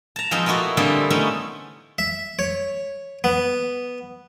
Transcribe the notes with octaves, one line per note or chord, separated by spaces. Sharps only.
A5 A#5
F3 G#3 B3 C4 D#4 F4
A#3 B3 D#4 E4 F#4 A4
D3 G3 A#3 C4 G#4 A4
A3 B3 C#4 D#4 E4
E5
C#5
B3